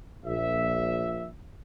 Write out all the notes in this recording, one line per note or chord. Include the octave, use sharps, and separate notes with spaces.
A#1 E5